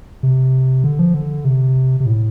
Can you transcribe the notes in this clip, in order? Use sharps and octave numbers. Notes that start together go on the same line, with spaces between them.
C3
D3
F3
D3
C3
C3
A2